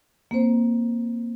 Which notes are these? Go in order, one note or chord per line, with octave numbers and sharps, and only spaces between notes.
A#3 C4 C5